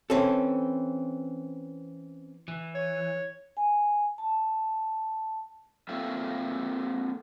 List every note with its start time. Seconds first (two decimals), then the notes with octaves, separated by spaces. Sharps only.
0.10 E3 C4 C#4 A4
2.48 E3
2.75 C#5
3.57 G#5
4.18 A5
5.89 A#3 C4 F4 A4 E5 G5